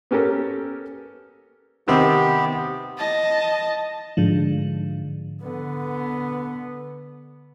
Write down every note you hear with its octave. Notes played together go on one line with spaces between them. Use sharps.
B3 C#4 G4 A4 A#4
C3 D#3 B3 C4 G4
D#5 A5
G#2 D3 F3
D3 B3